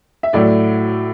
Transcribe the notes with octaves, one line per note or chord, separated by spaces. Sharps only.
E5
A2 F#3 A3 D5